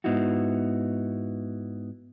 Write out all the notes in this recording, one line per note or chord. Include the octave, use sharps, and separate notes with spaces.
G#2 B3 D#4 E4 F#4